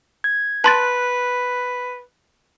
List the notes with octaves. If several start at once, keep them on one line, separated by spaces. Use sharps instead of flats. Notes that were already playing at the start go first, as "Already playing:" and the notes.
G#6
B4 A5 C6 F#6 A6